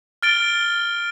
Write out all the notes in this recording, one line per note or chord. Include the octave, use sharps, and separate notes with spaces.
F6 A6 D7 G7